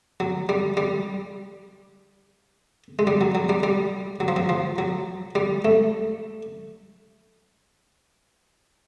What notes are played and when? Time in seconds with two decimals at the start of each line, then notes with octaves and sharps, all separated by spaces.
0.20 F#3
0.49 G3
0.77 G3
2.99 G#3
3.07 G3
3.21 F#3
3.35 F#3
3.49 G3
3.63 G3
4.20 F#3
4.28 F3
4.36 F#3
4.49 F3
4.78 F#3
5.35 G3
5.65 A3